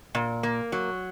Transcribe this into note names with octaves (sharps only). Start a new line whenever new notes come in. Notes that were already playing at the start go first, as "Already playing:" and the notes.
A#2
A#3
F#3